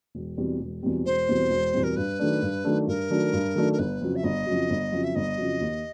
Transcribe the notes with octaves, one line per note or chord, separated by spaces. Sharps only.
E1
E2 B2 G3 C4
E1
E2 B2 G3 C4
E1 C5
E2 B2 G3 C4
E1
E2 B2 G3 C4
A#4
G2 B4
D#3 F#3 A3 D4
G2
D#3 F#3 A3 D4
G2 A#4
D#3 F#3 A3 D4
G2
D#3 F#3 A3 D4
A#4
G1 B4
F2 C#3 F#3
E5
G1 D#5
F2 C#3 F#3
G1
F2 C#3 F#3
E5
G1 D#5
F2 C#3 F#3
D#2